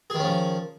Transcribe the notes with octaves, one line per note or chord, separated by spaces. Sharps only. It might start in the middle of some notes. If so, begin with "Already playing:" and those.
D#3 F3 C#4 G#4